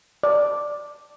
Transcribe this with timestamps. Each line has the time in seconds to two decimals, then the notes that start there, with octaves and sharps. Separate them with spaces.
0.23 D5